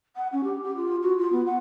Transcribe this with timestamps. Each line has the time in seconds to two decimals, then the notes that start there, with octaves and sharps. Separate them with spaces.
0.16 F#5
0.32 C#4
0.44 G4
0.64 G4
0.76 F4
1.02 F#4
1.18 F4
1.32 B3
1.46 F#5